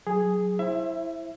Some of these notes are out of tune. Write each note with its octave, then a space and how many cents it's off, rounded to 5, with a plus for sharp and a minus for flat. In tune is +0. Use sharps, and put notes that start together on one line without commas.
F#3 +0 G#4 +0
E4 +0 C5 +25 E5 +25